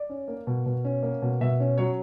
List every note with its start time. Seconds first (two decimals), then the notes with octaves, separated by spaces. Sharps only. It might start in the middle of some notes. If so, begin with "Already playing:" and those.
Already playing: D5
0.09 C#4
0.28 A#3
0.47 B2
0.66 B2
0.84 C#4
1.03 A#3
1.22 B2
1.41 B2 E5
1.60 C#4
1.78 F#3 C#5